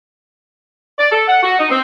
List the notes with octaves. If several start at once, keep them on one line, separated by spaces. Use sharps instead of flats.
D5
A4
F#5
F#4
D#4
C4